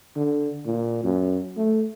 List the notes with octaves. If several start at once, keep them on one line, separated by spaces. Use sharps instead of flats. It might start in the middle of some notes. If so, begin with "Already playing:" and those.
D3
A#2
F#2
A3